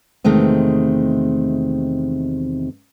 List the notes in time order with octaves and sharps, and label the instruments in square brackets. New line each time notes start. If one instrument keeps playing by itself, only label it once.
[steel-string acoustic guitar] E2 C3 D#3 G#3 A3 C4